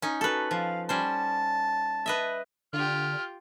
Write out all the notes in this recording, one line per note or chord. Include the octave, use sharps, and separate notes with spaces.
C#4 D#4
F#4 A4 B4
F3 F5
G3 C#4 C5 A5
B4 D#5 E5
D3 F4 G4 F6